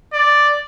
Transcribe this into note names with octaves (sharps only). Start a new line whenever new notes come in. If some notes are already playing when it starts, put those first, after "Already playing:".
D5